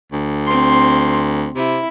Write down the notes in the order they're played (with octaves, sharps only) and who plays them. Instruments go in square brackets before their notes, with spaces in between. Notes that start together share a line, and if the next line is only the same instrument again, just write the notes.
[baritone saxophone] D2
[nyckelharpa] C4 C6
[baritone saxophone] C3 [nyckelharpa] E4